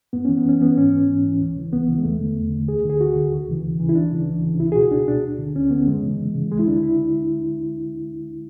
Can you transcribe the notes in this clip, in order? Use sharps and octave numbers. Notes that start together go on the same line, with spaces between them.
F#2 B3
E3 C#4
B3
F#2 C#4
E3 B3
G#2 C#4
E3
G#2
E3
C#2
C#3 E3
C#2 B3
C#3 E3
G#3
E2 A3
D3
E2
D3
D2 G#4
D3
G#4
D2 F#4
D3
D2
C#3 E3
D2
C#3 E3
E4
C#2 D4
C#3 E3
C#2
C#3 E3
C#2 E4
G#4
B2 F#4
C#2 D4
B2 D4
D2
D3
D2 C#4
D3 B3
F#2 G#3
C#3 E3
F#2
C#3 E3
D2 G#3
E4
D3 D4
E4